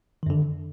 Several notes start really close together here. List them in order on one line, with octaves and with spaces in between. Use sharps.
D#3 F#2 D3